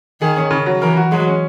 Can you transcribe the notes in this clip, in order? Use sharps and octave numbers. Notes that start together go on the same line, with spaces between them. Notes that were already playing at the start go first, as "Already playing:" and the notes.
D#3 G#4
C#4
C#3
F#3
E3 A#4
F#4
F#3 G#3
C#4